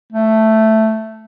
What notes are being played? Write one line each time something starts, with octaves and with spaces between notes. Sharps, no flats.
A3